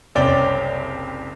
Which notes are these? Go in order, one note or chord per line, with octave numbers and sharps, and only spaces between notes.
F#1 C2 C#4 D5 G5